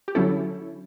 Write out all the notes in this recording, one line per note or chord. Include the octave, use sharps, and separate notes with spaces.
G4
D3 F#3 C#4 E4 A4